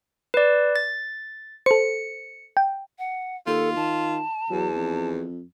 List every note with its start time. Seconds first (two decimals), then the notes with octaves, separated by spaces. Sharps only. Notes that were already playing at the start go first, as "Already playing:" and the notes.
0.34 B4 D5
0.76 A6
1.66 A4 C5 C#7
2.57 G5
2.99 F#5
3.47 D#2 F4 A4
3.76 D#3 A5
4.50 E2 F#3
4.76 F2